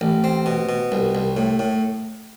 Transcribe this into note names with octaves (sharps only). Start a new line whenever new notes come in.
A1
C4
B2
B2
C2
C2
A2
A2